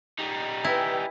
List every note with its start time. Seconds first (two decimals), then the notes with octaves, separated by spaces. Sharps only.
0.19 G3 D#4
0.64 E4 B4 E5 G5 G#5